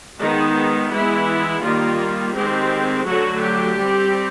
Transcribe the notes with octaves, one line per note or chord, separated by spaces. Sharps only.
D#3 G#3 B3 D#4
E3 G#3 B3 E4
D#3 G3 A#3 F4
D#3 G#3 C4 G4
D3 F#3 A3 F#4
G4
G3 C4